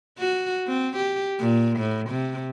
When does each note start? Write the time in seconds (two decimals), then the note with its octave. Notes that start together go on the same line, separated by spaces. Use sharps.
0.18 F#4
0.67 C4
0.97 G4
1.39 A#2
1.79 A2
2.09 C3